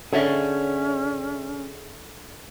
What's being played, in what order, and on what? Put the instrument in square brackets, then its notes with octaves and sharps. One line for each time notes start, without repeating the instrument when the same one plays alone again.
[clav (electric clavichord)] D3 [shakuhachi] C#4 [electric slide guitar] G#4 C#5 E5